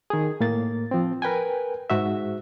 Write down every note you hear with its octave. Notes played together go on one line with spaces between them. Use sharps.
D#3 G#4
A2 A#3 A6
F3 C4
A#4 B4 G5 G#5
G#2 F#4 E5